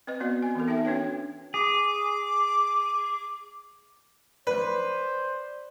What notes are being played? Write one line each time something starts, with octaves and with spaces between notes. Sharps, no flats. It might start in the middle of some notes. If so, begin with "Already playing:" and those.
C4 B4 D#5
B3 C4 F#4 D5
C4 G#5
E3 B3 A4 A#4
D#4 A4 A#4 E5 G5
C#4 D4 F#4 B4 C#5 G5
G#4 D6
B4 C5 D5